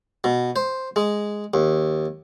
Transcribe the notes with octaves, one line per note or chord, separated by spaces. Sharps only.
B2
C5
G#3
D#2